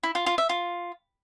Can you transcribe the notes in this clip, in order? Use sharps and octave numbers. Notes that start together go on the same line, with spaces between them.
E4
F4
F4
E5
F4